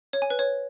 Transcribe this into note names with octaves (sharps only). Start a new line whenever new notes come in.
C#5
G#5
B4
C#5